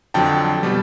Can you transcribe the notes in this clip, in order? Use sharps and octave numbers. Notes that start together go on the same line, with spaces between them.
F2 D3 F#3 G5 A5
B2 G3